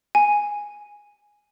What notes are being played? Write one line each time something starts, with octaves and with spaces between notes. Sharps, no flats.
G#5